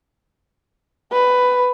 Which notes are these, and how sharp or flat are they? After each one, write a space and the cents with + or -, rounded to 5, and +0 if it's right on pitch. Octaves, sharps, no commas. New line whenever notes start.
B4 +10